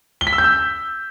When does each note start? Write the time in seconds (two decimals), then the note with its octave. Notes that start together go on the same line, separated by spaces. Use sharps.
0.21 G7
0.27 B6
0.33 E6
0.38 G6
0.44 E6